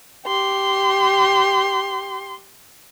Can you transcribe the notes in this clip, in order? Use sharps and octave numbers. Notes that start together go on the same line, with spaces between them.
G4 C6